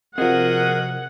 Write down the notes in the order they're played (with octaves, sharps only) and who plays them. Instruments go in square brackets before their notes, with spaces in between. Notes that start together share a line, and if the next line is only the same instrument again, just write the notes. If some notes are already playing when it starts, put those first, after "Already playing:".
[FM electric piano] C3 F3 [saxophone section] F#4 G#4 D#5 [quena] A#4 [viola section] F#5